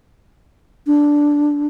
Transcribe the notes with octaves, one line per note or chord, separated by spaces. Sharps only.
D4